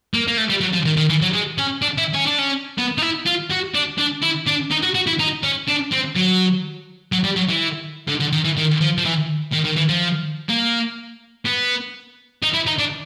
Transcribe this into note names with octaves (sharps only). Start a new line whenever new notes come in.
A#3
A#3
A3
G3
F#3
F3
D#3
D#3
E3
F#3
G#3
C#4
D4
E4
C#4
D4
C#4
B3
D#4
E4
F4
F#4
D4
D4
E4
D4
D#4
F#4
F#4
E4
D#4
C#4
D4
C4
F#3
F#3
G3
F#3
E3
D3
D3
D#3
E3
D#3
F3
F3
E3
D#3
D#3
E3
F3
A#3
B3
D#4
E4
D#4
D4